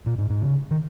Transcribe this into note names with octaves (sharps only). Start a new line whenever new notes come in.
A#2
G#2
G#2
C#3
D#3